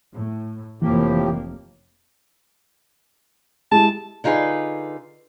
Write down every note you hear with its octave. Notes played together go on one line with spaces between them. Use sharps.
A2
F1 A2 E3 F3 A#3 G4
G#3 E4 G4 A5
D3 D#4 F4 G#4 B4